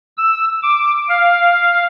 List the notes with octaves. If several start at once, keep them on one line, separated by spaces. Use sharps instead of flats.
E6
D6
F5